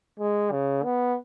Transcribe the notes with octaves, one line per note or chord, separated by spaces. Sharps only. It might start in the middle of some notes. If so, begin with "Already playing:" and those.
G#3
C#3
B3